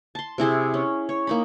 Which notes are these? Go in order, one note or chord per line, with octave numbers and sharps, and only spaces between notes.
A5 C6
C3 E4 G#4 C5
C#4
C#5
A#3 D#4 B5